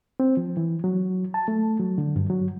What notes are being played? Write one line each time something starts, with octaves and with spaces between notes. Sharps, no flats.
C4
F3
E3
F#3
A5
A3
F#3
D3
G2
F#3